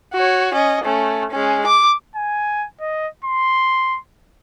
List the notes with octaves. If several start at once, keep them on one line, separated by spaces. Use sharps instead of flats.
F#4 C#5
C#4 D#5
A3 C#4
G#3 C#4
D6
G#5
D#5
C6